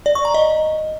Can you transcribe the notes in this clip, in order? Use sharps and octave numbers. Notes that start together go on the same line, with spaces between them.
D5
C#6
A#5
D#5